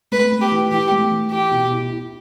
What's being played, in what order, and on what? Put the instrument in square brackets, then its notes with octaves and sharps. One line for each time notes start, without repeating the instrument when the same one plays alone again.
[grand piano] A3 [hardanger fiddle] B4
[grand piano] A3
[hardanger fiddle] G4
[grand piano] E3
[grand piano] E3 [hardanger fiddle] G4
[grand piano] A3
E3
[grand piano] E4 [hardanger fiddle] G4
[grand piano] B2
E4
E4